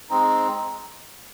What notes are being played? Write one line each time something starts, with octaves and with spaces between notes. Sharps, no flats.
G#3 C4 D#4